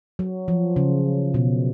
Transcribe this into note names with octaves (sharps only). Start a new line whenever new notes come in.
F#3
F3
C#3
B2